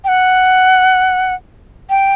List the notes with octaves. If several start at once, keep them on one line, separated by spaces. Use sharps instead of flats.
G5
F#5
G5